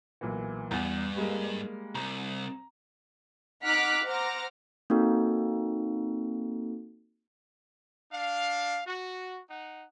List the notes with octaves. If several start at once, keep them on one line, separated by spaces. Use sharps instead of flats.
B1 A#2 E3
E2 G2
G3 G#3 A#3
C2 A#5
D#4 F#5 D6 F6 F#6 B6
C5 F#5 A#5 D6 F6 A#6
A#3 C4 D#4 F#4 A4
D4 F5
F#4
D#4 F#5